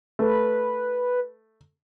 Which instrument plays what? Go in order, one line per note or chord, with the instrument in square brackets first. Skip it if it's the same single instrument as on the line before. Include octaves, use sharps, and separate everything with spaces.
[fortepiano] A3 [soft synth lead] B4